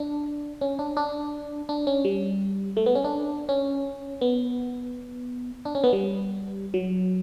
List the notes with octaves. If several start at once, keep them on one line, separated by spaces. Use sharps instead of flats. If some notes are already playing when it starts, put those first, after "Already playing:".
Already playing: D4
C#4
D4
D4
D4
C#4
G3
A3
B3
C#4
D4
C#4
B3
D4
C#4
B3
G3
F#3